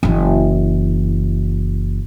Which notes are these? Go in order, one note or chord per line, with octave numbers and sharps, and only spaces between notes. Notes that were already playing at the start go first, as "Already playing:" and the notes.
F#1 E3